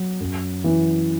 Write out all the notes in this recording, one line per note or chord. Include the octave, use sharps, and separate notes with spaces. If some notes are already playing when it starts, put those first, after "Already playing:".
Already playing: F#3
F#2
E3